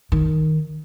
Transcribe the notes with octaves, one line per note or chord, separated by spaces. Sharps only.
D#3